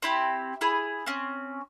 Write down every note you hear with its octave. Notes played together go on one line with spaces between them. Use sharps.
C4 E4 G4
E4 G#4
C4 C#4